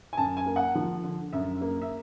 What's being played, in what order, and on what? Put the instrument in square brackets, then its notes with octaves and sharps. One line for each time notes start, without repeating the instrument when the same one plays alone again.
[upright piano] G#5
F#2 A5
G#5
A#3
F#5
F3
D3
F#2 E5
A#3
E5